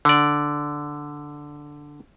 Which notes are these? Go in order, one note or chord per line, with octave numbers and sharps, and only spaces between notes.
D3 D5